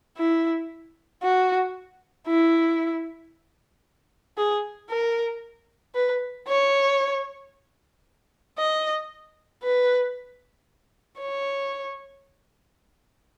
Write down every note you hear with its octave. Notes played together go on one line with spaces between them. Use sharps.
E4
F#4
E4
G#4
A#4
B4
C#5
D#5
B4
C#5